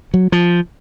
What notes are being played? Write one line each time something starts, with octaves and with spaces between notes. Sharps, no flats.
F#3
F3